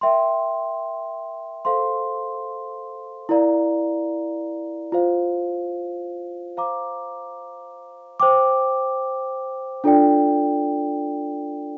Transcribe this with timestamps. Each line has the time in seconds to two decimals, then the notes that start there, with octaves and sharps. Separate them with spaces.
0.01 A#4 E5 G5 C6
1.65 A4 C5 F5 C6
3.29 E4 A#4 D5 F5 A#5
4.92 F4 C5 F5
6.57 C5 F5 A#5 D6
8.20 C5 G5 D6
9.84 D4 F4 A4 D5 G5